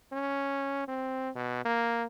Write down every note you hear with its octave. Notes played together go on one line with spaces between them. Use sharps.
C#4
C4
B2
A#3